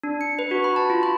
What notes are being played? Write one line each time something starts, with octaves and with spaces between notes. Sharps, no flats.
D4
C#7
B4
F#4
B5
A5
F4
B5